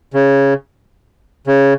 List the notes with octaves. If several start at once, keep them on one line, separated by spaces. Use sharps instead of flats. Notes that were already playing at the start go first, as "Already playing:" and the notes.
C#3
C#3